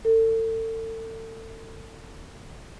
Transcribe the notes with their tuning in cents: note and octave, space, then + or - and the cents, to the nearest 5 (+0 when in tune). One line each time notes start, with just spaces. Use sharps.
A4 +35